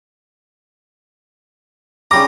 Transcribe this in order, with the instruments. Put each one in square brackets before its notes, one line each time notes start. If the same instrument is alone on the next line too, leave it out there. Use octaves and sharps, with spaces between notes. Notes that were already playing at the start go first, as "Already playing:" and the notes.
[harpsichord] C#3 G3 A#5 [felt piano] D6